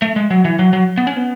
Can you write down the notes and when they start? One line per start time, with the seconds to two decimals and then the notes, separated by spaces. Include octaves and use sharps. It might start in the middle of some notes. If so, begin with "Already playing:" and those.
0.02 A3
0.16 G#3
0.31 F#3
0.45 E3
0.59 F#3
0.73 F#3
0.98 B3
1.07 C#4
1.17 B3